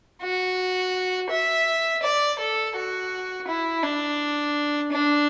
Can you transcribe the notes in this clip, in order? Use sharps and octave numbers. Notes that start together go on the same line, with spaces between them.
F#4
E5
D5
A4
F#4
E4
D4
D4